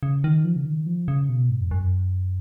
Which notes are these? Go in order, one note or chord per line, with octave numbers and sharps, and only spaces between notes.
C#3
D#3
F3
C#3
D#3
F3
C#3
B2
G#2
F2
F#2